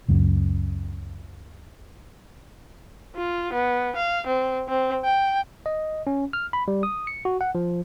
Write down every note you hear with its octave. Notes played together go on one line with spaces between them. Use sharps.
C#2 F#2
F4
B3
F5
C4
C4
G5
D#5
C#4
F6
B5
G3
D#6
C#7
F#4
F#5
F3